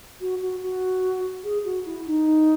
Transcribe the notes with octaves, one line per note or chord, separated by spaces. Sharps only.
F#4
F#4
F#4
G#4
F#4
E4
D#4